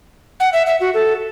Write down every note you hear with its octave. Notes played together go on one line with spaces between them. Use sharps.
F#5
E5
E5
F#4
A4